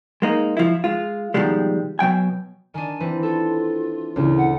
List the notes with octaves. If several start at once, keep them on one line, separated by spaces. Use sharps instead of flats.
G#3 A#3 D#4
F3 E4
G#3 F4
B2 D#3 F3 G3 G#3
B2 F#3 G5 G#5
D#3 D4 G#5
E3 C4 B4
F4 A4
D2 A#2 C#3 E3
F#5